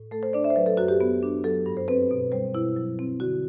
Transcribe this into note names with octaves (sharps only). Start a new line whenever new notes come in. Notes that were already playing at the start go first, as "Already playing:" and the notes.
Already playing: A2
A3 A4
C5
D4 D5
E5
C5
F#3 B4
A4
F#2 F#4
G4
B3
D4
F#3 A4
G2
C5
C4 B4
B2
G3 C5
B2 E4
F#3
C4
D3 F#4